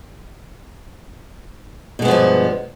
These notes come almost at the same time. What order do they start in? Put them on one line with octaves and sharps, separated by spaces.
B2 G#3 B3 F3 G2